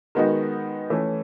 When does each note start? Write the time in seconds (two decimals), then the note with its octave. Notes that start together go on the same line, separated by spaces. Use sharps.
0.15 D#3 G#3 B3 D#4 F#4
0.90 E3 A3 C#4